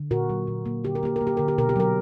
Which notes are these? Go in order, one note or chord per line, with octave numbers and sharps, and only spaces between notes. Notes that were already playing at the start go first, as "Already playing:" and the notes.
Already playing: D3
A#2 F#4 A#4
F#3
A#2
A#3
D3 G4
A#4
A#3 G4
A#3 A#4
G4
D3 A#4
G4
B2 A#4
G4
F#3 A#4